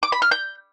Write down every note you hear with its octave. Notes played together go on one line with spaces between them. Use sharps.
D6
B5
F6
G6